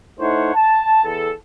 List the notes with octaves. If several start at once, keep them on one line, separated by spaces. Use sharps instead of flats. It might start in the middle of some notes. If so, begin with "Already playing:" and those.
A3 D#4 E4 C5 C#5 F#5
A5
E2 A4